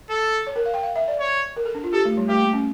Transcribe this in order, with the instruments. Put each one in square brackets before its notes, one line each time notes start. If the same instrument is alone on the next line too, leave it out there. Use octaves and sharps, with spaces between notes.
[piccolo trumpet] A4
[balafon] C#5
A#4
F5
G5
F5
E5
D5
[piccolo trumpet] C#5
[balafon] A#4
A4
D4
F4
[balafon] G4 [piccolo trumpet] A4
[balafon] A3
G3
[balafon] A3 [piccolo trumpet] G4
[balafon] A#3
C#4